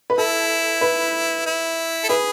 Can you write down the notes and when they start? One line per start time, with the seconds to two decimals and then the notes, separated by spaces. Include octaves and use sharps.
0.10 B4
0.18 E4 A4
0.81 B4
1.46 E4
2.04 A4
2.09 E4 G#4 B4